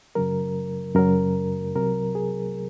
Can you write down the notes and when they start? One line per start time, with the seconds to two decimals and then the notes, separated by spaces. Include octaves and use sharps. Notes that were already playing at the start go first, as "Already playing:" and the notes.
0.15 F#2 C#3 F#3 A#4
0.95 F#2 C#3 F#3 A#4
1.75 C2 C3 F#3 A#4
2.15 G#4